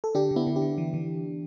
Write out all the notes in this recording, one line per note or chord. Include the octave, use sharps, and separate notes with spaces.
A4
D3 D4 G4
D3
B3 E4
D3
D4 G4
D3
E3
E3